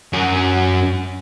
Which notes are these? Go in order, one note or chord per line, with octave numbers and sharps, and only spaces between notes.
F#2 C#4